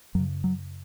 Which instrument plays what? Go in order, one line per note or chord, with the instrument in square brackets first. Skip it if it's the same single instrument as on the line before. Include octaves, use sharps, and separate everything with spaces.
[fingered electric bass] F#2 F#3
C#3
F#3